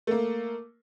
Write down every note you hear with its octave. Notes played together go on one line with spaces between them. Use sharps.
A3 A#3